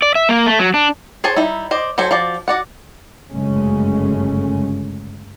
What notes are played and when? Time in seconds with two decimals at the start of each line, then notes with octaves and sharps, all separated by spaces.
0.02 D5
0.15 E5
0.29 A#3
0.46 A3
0.59 F#3
0.74 D4
1.24 G#4 C5 C#5 G#5 A5
1.36 G3 D#4 E4
1.71 C5 D5 D#5
1.98 F#3 A4 C5 G#5
2.11 F3 F#4 D5
2.48 F#4 D5 F#5
3.32 G1 F#2 C#3 G#3 A3 C#4